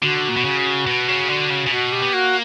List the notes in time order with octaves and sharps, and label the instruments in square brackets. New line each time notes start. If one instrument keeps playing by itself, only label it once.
[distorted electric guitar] D3 [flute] F#4
[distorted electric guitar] A#2
B2
C#3
B2
C#3
D3
C#3
C#3
[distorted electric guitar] B2 [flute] F#4
[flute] G4
[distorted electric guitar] B3
[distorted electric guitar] A#3 [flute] F#4